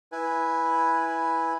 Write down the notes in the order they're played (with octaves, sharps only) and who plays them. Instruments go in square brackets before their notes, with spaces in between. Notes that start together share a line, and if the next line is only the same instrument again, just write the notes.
[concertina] E4 B4 G#5